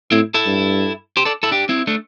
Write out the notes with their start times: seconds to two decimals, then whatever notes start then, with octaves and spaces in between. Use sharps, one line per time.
0.11 A2 C4 E4
0.34 E4 A4
0.46 G2
1.17 G4 C5
1.25 A4 D5
1.43 E4 A4
1.51 D4 G4
1.69 C4 E4
1.87 A3 D4